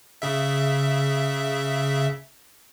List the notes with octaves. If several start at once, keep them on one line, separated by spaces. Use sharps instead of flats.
C#3 E5